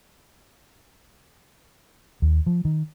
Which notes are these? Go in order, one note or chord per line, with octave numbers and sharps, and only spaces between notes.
D#2
F3
D#3